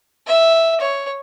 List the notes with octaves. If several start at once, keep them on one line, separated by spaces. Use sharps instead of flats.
E5
C#5